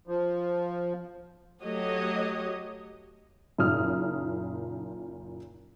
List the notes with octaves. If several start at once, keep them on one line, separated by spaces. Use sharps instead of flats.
F3
F#3 A3 G4 C#5 D#5
F#1 A#2 D#4 D#6 F6